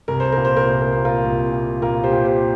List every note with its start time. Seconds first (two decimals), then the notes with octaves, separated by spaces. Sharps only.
0.08 C2 A#4
0.20 C5
0.32 A#2 A#4
0.45 C5
0.57 A#4
0.67 C2 C5
0.81 A#4
0.93 A#2 C5
1.05 F4 A#4
1.24 C2
1.52 A#2
1.82 A#2 F4 A#4
2.04 G4 C5
2.11 A#2
2.25 G4 C5